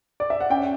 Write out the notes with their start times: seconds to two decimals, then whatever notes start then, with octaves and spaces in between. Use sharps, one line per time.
0.20 D5
0.30 E5
0.40 F#5
0.50 C#4 G5